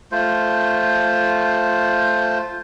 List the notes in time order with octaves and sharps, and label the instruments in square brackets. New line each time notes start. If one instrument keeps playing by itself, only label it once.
[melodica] A3 F4 C5